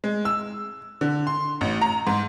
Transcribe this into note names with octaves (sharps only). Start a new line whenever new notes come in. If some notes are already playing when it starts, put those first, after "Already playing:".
G#3
E6
D3
C6
A1
A#5
G#2